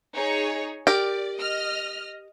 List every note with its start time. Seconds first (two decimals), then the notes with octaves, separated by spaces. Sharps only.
0.13 D#4 G#4 C#5
0.87 G4 A#4 D5
1.37 D#5 F6